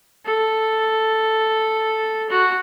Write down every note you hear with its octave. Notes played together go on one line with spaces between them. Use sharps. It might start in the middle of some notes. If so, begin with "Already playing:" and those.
A4
F#4